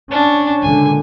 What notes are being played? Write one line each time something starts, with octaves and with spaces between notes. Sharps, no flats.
C#4 D4
C#2 A#2 D3 G#5